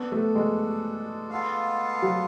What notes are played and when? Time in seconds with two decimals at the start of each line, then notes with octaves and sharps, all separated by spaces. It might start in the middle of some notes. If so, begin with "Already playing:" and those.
Already playing: B3 D4 F#4 A4
0.12 A3
0.35 G#3
1.30 B3 F4 A4 F5
2.02 F#3